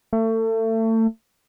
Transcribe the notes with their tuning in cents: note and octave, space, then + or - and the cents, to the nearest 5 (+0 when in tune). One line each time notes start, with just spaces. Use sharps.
A3 +30